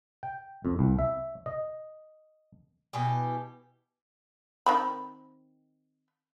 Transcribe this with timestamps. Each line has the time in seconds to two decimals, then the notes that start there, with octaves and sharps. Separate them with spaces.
0.23 G5
0.65 F2
0.79 C2
0.99 E5
1.46 D#5
2.93 B2 E3 G4
4.66 D#3 C4 B5